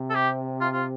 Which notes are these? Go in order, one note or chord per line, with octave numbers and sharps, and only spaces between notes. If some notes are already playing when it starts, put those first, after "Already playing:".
Already playing: C3
A4
G4
F4
F4